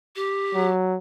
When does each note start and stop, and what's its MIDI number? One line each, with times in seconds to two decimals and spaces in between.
0.16 0.69 67
0.55 0.97 54